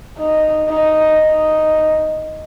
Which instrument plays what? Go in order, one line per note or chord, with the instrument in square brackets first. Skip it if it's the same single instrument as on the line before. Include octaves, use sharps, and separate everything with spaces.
[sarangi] D#4
D#4
D#4